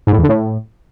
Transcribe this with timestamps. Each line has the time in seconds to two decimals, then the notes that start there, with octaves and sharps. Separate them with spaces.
0.07 G#2
0.12 A2
0.18 E2
0.23 D3
0.29 A2